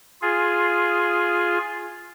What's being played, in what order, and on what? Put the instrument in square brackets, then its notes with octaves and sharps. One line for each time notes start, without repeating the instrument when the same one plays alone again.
[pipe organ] F4 G#4